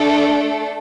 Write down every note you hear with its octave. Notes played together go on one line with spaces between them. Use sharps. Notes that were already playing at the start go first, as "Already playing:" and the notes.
Already playing: A3 D4 A4